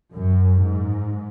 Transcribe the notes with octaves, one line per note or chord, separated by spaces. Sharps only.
F#2
G#2